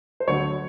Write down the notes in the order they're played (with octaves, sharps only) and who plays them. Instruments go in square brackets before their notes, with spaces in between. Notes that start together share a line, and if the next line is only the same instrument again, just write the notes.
[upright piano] C5
D2 D3 F#3 C#5